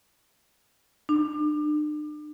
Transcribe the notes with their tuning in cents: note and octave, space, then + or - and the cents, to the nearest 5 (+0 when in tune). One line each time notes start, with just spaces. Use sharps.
D4 +45